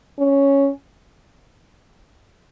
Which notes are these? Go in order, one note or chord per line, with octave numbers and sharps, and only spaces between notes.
C#4